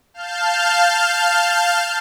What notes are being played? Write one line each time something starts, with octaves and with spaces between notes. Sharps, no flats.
F5 A5 F6 G6